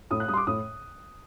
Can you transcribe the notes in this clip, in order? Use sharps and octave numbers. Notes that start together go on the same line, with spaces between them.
A2 D#6
F#6
G3 D#6
C6
D6
A2 D#6